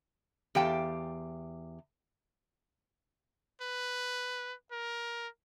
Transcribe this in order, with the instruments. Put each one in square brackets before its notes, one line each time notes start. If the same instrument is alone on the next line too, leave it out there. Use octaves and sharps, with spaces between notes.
[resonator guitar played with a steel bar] E2 G4 F5 G5 A5
[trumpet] B4
A#4